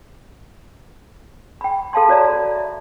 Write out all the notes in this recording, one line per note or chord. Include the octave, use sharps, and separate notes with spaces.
G5 B5
A4 F5 A5 C6
F#4 C#5 D5 A#5
A4 B5
E5